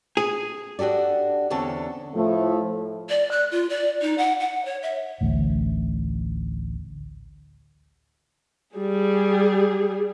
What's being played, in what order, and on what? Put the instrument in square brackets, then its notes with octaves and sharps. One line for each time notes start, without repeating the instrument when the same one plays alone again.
[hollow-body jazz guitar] G#4
[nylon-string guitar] D4 F#4 G4 A4 D5
E2 D3 C4 C#4 A5
[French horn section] A2 F3 A3
[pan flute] D5
F#6
F4
D5
D#4
F#5
F#5
C#5
E5
[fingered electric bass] A1 D2
[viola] G3 G#4